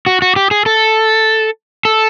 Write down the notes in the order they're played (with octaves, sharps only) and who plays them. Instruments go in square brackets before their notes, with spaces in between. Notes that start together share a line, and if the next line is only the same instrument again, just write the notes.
[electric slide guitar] F#4
F#4
G4
G#4
A4
A4